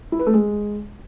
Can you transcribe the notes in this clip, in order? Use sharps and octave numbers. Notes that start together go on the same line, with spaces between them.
E4
B4
A3
G#3